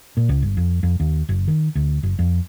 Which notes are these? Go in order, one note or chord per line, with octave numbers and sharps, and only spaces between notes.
A#2
C#2
G1
F2
F2
D#2
F#1
D#3
D2
F#1
F2